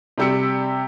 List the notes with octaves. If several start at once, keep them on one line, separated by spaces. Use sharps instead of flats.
C3 G3 G4 E6 C#7